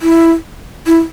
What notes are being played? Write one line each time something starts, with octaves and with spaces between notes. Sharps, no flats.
E4
E4